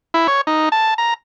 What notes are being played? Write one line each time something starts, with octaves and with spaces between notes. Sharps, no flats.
E4
C#5
D#4
A5
A#5